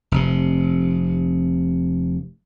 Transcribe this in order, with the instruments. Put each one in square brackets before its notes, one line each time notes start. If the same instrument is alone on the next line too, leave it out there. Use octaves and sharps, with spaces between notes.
[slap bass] F1 C3